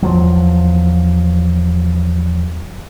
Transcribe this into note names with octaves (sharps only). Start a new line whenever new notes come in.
E2 F3 F#3